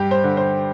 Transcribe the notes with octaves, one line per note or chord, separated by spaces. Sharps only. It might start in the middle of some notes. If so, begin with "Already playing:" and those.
Already playing: G2 G4
C5
D3
C5